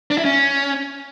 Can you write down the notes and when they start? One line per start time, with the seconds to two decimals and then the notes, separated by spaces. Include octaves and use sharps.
0.11 D4
0.18 E4
0.25 C#4